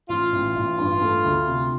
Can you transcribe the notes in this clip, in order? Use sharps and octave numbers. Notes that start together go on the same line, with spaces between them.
A1 F4
A1
A1
G2
A3
D2
C3